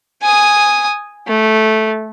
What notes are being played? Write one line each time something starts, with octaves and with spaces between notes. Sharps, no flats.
G#5 D#6
A3